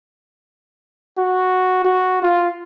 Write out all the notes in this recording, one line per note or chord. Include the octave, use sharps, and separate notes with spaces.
F#4
F#4
F4